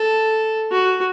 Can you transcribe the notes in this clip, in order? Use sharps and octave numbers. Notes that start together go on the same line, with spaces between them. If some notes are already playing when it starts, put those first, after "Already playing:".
Already playing: A4
F#4